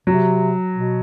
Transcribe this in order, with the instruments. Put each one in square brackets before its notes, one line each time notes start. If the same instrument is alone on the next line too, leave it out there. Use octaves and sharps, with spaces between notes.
[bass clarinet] C3 [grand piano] F#3
[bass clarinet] B2